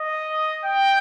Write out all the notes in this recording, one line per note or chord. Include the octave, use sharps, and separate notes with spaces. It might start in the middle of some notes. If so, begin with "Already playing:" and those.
Already playing: D#5
G5